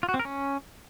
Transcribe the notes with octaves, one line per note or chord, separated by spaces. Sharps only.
F4
F#4
C4
A#4
C#4